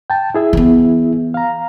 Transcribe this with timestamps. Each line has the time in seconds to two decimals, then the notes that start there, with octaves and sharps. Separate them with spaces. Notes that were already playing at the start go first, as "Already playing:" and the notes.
0.10 G5 A5
0.35 E4 G#4 E5
0.53 E3 B3
1.34 F5 A#5